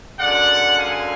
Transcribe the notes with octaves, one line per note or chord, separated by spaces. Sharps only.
F#2 D3 G#3 D5 F#5
F5 G#5